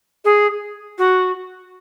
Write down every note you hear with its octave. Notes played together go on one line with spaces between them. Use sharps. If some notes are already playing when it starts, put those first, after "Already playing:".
G#4
F#4